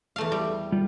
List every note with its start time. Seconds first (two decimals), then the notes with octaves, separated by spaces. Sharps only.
0.16 E2 A3 F5
0.32 G3
0.72 G3 F4